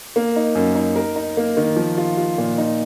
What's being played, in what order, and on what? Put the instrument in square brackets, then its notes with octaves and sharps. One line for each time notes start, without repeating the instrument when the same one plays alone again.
[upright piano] A#3
D#4
F#2
D#4
A#4
D#4
A#3
D#3
F3
F4
F4
A#2
D#4